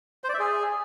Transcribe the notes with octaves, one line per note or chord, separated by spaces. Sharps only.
C5
D5
E5
G#4